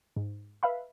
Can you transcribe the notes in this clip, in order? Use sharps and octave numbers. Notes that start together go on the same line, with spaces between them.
G#2
B4 E5 F5 B5